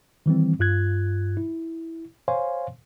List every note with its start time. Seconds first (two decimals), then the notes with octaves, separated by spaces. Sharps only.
0.26 D#3 E3 G3 C4
0.60 G2 F4 F#6 G#6
1.37 E4
2.28 C5 C#5 F5 G#5 C6